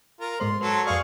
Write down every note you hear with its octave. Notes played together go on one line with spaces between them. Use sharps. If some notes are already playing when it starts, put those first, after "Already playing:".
F4 A#4
G#2 G#3 C5 C6
F#3 A4 B4 C6
F2 G#4 D5 F5 C#6